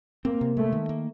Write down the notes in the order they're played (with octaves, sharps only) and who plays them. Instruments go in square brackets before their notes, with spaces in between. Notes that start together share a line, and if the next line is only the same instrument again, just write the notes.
[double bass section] A#3 [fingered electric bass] C4
[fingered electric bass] C3
[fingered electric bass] G#3 [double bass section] A3
[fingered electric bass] D#3
A#3